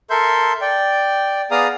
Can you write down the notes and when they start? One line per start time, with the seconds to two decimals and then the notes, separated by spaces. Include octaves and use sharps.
0.10 A4 A#4 E5 C6 G6
0.61 D5 G5
1.51 B3 G#4 D5 F5 A#5 D#6